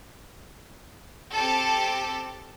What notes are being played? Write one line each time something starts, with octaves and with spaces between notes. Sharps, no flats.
C4 G4 A4